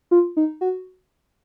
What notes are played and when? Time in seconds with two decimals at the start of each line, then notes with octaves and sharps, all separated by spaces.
0.11 F4
0.37 D#4
0.61 F#4